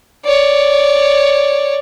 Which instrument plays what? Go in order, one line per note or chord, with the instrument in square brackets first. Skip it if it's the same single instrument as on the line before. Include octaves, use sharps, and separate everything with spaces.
[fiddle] C#5 D5